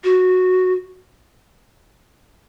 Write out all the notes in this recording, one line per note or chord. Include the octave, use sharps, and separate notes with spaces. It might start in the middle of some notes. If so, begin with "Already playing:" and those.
F#4